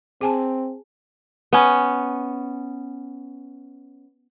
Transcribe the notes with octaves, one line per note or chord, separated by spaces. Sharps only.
C4 G#4 G#5 A5
B3 C#4